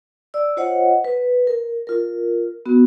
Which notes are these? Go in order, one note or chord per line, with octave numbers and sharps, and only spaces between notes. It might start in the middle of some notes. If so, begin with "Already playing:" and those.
D5 E6
F4 C5 C#5 D#5 F#5
B4
A#4
F4 A#4
B3 F#4